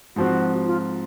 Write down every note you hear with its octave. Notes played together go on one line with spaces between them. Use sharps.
G#2 F3 C4 F#4
F4